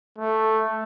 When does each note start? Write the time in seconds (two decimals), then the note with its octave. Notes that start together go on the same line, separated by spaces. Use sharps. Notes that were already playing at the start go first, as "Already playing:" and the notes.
0.18 A3